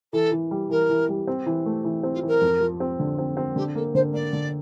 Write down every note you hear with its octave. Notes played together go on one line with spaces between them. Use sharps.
E3 A4
E3
G3
E3 A#4
E3
G3
C4
E3
A3
E3
C4
F4
E3 A#4
F2
F3
C4
D3
C4
C4
D3 G4
A#3 A4
D3 C5
A#3 D5
D3